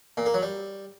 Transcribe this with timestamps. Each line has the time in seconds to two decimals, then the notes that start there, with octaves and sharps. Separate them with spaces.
0.17 A#2
0.26 A#3
0.34 F#3
0.42 G3